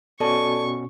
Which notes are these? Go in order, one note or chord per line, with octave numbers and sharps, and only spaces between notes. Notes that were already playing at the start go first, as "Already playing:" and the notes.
B2 C#4 F#4 A4 D5 A5 C#6